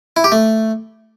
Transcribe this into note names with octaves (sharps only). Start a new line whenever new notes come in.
E4
G4
A3